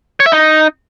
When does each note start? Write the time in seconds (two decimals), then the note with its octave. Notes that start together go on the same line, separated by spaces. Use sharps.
0.20 C#5
0.26 E5
0.32 D#4